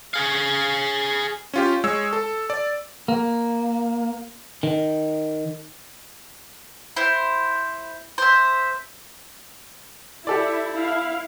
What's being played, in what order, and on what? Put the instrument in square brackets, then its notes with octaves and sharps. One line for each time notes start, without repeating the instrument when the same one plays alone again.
[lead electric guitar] G#4 F5
[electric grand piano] C#4 F4 G4
G#3 C#5 E6
A4
D5
[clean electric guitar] A#3
D#3
[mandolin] E4 C5
C5 E5
[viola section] E4 [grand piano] G4 A4 D5
[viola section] E4 F5